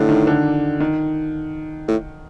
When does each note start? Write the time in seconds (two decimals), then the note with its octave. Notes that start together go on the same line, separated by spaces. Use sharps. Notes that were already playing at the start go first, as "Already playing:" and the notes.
Already playing: A2 D3
0.09 D#3
0.27 D3
0.80 D#3
1.88 A2